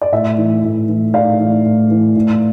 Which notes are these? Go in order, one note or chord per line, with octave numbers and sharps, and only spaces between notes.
D5
A2 E5
E3
A2
E3
A2 D5 F5
E3
A2
E3
A2